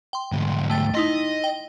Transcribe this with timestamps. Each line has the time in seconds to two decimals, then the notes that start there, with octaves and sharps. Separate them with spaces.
0.13 G5 C6
0.32 D2 G#2
0.70 A3 G5 A6
0.95 D#4 E4 D#5 C6
1.44 G5